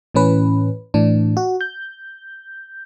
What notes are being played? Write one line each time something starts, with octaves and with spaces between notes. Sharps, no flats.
A2 E3 C#4 B4
A2 E3 D4
F#4
G6